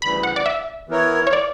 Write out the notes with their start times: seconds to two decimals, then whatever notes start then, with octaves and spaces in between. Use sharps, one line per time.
0.02 D2 C#3 E3 G3 B5
0.23 F#5
0.36 D5
0.46 E5
0.89 E3 B3 E4 A#4 C#5
1.27 C#5
1.33 D5